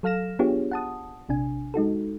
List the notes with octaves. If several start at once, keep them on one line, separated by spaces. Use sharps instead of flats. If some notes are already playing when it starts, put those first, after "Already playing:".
F#3 A4 F5 F6 A#6 E7
B3 D4 F4 G4 G#4 C#5
F#5 A5 D#6
A#1 C3 D4 G#5
G#3 D#4 F#4 A4